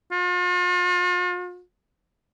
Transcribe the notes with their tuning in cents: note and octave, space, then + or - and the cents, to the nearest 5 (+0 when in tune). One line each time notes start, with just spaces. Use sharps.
F4 +40